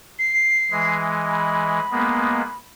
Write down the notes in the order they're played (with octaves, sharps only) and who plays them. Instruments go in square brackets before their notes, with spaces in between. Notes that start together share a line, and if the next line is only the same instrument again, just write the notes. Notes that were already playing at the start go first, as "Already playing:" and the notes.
[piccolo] C7
[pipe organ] E3 G#3
[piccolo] B5
[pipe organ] G#3 A#3 B3